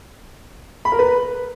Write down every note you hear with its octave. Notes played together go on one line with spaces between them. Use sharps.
B5
A#4
B4